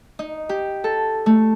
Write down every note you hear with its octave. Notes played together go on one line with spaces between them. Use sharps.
D#4
G4
A4
A3